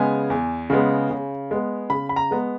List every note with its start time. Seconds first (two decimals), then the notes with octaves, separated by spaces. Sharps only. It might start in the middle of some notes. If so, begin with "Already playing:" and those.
Already playing: C#3 G#3 B3 G#5
0.30 E2
0.70 C#3 G#3 B3
1.11 C#3
1.51 G#3 B3
1.90 C#3 B5
2.09 B5
2.16 A#5
2.31 G#3 B3